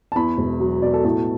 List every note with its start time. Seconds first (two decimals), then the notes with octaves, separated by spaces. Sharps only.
0.12 A5
0.15 E2 B5
0.38 E1
0.60 F#3
0.82 B2 D5
0.94 A4
1.05 A2 A4